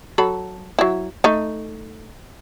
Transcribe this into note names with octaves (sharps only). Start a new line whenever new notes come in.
F#3 A4 B5
F#3 E4
A3 D#4